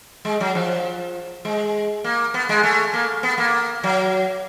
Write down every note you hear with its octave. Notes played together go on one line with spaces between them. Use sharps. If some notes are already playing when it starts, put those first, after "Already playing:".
G#3
F#3
F3
G#3
A#3
B3
G#3
A3
A#3
B3
A#3
F#3